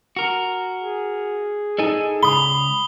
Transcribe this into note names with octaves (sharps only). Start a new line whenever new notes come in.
F#4 A#4
G#4
D#4 E4 A4 G#5
C#2 B5 D#6 G7